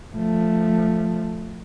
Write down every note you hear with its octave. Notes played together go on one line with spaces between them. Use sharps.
F3 A3